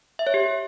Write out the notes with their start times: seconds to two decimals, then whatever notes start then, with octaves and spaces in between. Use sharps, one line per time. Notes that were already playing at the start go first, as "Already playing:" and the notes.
0.19 E5
0.27 C#5
0.34 G4